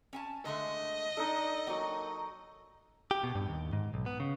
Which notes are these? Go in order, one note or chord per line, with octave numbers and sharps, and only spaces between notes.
C#4 G#5 A5
D3 G#3 A3 D#5
D4 D#4 A4
F#3 A#3 D#4 F#4 G5
G4
B2
G2
D#2
G#2
B1
B3
C#3